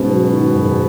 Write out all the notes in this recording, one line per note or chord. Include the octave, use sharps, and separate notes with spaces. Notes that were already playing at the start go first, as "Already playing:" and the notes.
Already playing: G#2 B2 C#4
F#3
D#3
F#2